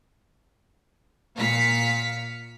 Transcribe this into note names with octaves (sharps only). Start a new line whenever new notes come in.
A#2 F5 B6 C#7